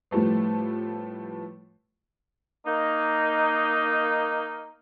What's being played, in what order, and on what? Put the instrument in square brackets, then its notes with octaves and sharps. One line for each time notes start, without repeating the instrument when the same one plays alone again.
[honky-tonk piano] A2 F3 G3 A3 B3
[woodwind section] A#3 D#4